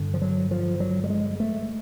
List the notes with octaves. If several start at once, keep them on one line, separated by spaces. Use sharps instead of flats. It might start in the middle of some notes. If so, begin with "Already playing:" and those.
Already playing: G2 D3
F3
F#3
F3
F#3
G3
G#3
A3